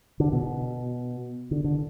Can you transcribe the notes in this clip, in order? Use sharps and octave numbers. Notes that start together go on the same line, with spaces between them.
D3
B2
D3
D3